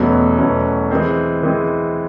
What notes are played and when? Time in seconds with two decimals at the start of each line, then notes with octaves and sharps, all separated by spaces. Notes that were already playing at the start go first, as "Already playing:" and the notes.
Already playing: E2 B2 F#3 A3 C#4
0.38 E2 B2 F#3 A3 C#4
0.91 E3 G#3 C4
1.43 E3 G#3 C4